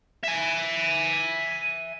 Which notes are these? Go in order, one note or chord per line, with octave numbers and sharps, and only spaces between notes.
E5 G#5